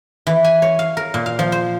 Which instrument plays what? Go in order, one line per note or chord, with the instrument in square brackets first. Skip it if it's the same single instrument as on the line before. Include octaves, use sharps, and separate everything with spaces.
[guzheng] E3
G#5
C#5
F5
A#4
A#2
F5
F3
C5